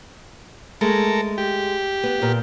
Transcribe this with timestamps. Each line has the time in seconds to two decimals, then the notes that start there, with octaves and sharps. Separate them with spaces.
0.81 G#3 A3 A4 A#4
1.38 G4
2.03 B3
2.22 A#2 A#3 B3